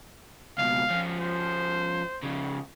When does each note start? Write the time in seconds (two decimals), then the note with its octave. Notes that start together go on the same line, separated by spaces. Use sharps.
0.58 C#2 B2 F5
0.90 F3 C#4
1.20 C5
2.23 C#3 F3